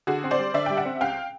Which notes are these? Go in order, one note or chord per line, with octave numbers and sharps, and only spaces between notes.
D3 F#4 G#4
C4
C5 D5
G3
D3 D5 E5
G3 G5
E5 F#5
C4
C#2 F5 G5